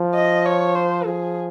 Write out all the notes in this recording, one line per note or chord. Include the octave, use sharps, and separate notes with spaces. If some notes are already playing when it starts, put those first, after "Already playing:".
Already playing: F3
D#5
C#5
C5
F3 G#4